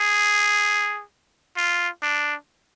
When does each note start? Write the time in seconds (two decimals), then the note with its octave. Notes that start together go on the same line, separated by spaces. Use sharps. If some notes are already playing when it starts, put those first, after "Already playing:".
Already playing: G#4
1.57 F4
2.02 D4